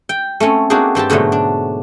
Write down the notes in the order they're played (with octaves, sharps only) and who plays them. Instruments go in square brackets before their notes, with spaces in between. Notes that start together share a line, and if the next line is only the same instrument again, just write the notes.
[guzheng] G5
A3 C4 C#4 G#5
A#3 C4 D4 D#4 F#4 G#4
G2 C4 G4 A5
G#2 B2 D3 F#3 A3
D4